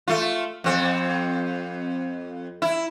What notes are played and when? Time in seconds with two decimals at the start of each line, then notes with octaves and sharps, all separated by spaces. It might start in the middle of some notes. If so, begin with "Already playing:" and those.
0.08 A3 F4
0.64 F2 C4
2.62 E4